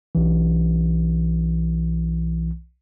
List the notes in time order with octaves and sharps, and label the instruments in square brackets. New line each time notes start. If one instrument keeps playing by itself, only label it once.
[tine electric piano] B1 E3